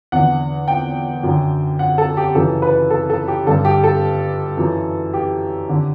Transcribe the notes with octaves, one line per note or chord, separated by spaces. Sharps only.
E2 D3 F#5
G5
F#2 D3
F#5
A4
G4
F#2 C#3 E3 A4
B4
A4
A4
G4
G2 D3 A4
G4
A4
F#2 E3
G4
D3